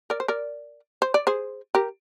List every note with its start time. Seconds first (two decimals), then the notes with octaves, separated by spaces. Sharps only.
0.10 A#4 D5
0.20 C5
0.28 A#4 D5
1.02 C5
1.14 D5
1.27 G#4 C5
1.75 G4 A#4